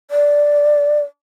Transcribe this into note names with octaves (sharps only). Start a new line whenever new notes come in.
D5